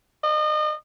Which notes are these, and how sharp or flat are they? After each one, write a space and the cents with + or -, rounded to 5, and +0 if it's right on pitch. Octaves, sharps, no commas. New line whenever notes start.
D#5 -35